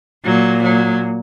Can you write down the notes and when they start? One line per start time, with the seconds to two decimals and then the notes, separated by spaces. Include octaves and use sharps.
0.24 A#2 F#3
0.62 F#3